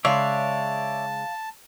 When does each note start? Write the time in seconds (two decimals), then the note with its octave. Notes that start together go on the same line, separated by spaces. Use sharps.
0.05 C#3 G#3 C#5 D5 E5 F5 A5